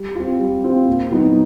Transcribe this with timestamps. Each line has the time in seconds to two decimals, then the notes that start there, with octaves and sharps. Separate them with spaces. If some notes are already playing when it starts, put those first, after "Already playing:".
Already playing: G3
0.15 C4 F4
0.39 G3
0.64 C4 F4
0.88 A#2
1.11 F#3 B3 D#4